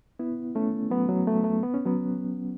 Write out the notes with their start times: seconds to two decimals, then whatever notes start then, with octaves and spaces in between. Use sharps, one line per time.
0.19 B3 E4
0.55 A3 C#4
0.90 F#3 B3
1.09 F#3
1.27 A3
1.44 A3
1.63 B3
1.74 C#4
1.86 F#3 B3